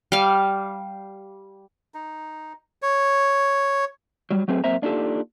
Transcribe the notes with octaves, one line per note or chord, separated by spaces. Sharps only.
G3 F5
D#4
C#5
F#3 G3
F#3 A3 C4 G#4 B4
F#2 A#3 C4 C5 E5 A#5
A#3 D4 D#4 F4 G4 A4